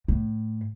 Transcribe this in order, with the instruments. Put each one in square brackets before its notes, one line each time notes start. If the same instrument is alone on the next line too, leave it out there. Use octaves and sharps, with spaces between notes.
[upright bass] A2